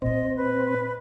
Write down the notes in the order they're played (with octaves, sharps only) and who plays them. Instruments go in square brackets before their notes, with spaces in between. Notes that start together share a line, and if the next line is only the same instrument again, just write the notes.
[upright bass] A#2 A#3 [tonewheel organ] C4 [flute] D#5
[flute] B4